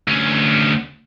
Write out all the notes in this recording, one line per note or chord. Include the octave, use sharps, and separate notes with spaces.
D2 C#4